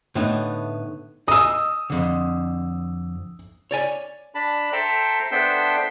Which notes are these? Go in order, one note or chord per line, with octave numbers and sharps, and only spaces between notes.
A2 D3 B3 D#4
D#5 G#5 D#6 E6
F2 D3
C#5 D5 G#5
D4 A5 B5
A4 C5 E5 G5 A5 A#5
B3 D4 A4 C5 E5 G5